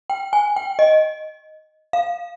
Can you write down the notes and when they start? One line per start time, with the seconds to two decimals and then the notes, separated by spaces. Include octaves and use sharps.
0.10 G5
0.33 G#5
0.56 G5
0.79 D#5
1.93 F5